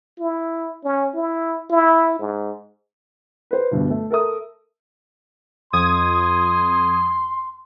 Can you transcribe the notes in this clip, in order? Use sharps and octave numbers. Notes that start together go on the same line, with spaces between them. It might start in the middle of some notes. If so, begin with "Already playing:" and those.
E4
C#4
E4
E4
G#2
B4 C5
D2 G2 B2
A3
A4 A#4 E5 D#6
F2 C6 D#6 G#6